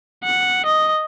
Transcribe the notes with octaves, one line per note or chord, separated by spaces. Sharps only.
F#5
D#5